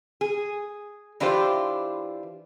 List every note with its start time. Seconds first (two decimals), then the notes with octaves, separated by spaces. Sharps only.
0.21 G#4
1.20 E3 D4 E4 F4 G4 C5